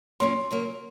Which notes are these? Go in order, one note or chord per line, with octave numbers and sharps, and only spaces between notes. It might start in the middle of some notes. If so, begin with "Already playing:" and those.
F#3 A#3 C#4 F4 G#4 C6
C#3 F#3 A#3